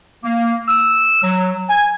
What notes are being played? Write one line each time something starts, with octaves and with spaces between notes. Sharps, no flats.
A#3
E6
F#3
G#5